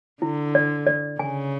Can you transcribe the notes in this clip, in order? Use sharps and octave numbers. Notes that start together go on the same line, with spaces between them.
D3 E4
D5
D5
C#3 G#5